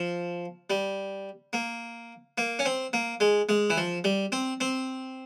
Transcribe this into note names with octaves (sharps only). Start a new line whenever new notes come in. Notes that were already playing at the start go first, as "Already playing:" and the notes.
Already playing: F3
G3
A#3
A#3
C#4
C4
A#3
G#3
G#3
E3
F3
G3
C4
C4